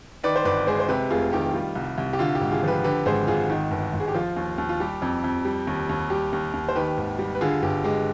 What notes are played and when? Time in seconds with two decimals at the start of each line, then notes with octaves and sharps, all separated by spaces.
0.24 D#3 B4 D5
0.36 C5
0.45 G1 B4 D5
0.67 G#3 G#4 C5
0.80 C5
0.88 C3 G4 B4
1.10 F1 F4 G#4
1.33 D#3 G4
1.54 G3 F4
1.75 C2
1.98 C2
2.13 G4
2.19 D3 F4
2.35 G4
2.41 G#1
2.52 F4 G#4
2.63 F3 G4 B4
2.84 D3 G4 B4
3.06 G#1 G#4 C5
3.27 G#1 F4 G#4
3.50 D#3
3.71 G1
3.94 G1
4.00 G#4
4.08 G4
4.15 F3 F4
4.36 D#2
4.58 D#2
4.69 F4
4.80 G3 G4
5.02 F2
5.24 F2
5.45 G3
5.67 D#2
5.89 D#2
6.10 G3 G4
6.33 D#2
6.54 D#2
6.69 C5
6.75 D#3 G4 B4
6.97 G#1
7.19 G3
7.35 B4
7.41 D3 F4 G#4
7.62 G1 G4
7.84 G#3 G4